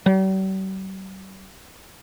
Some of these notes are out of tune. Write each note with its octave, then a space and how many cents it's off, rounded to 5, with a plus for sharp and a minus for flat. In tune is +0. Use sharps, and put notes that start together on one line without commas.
G3 -45